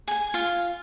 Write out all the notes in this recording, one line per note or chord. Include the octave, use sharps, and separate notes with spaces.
G#4 G#5
F4 F5